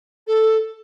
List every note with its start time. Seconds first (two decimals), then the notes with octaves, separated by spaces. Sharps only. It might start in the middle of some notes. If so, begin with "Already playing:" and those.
0.27 A4